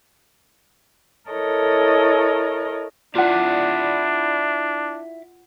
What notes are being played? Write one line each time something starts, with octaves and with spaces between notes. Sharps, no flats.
E4 A4 A#4 C#5 D#5
D4 E4 F4 D5 F#5